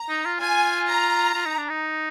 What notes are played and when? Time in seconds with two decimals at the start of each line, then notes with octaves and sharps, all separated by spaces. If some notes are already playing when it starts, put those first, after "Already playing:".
Already playing: A#5
0.09 D#4
0.26 F4
0.40 F4 G#5
0.88 A#5
1.35 F4
1.46 D#4
1.58 D4
1.70 D#4